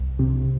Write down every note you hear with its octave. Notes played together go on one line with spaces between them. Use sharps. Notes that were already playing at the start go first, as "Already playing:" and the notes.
Already playing: C2
C3